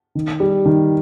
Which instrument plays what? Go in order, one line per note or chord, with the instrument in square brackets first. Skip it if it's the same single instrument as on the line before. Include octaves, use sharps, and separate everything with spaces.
[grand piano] D#3
G3
D#3